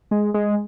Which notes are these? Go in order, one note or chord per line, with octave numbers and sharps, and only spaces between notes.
G#3
G#3